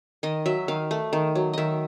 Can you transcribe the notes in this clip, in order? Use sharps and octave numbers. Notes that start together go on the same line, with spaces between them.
D#3 D#5
F#3 E5
D#3 F5
A3
D#3
F#3
D#3 D#5 E5